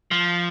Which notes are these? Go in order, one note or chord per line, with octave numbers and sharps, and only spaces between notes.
F3